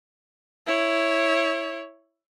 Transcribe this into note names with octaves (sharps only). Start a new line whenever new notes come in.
E4 C#5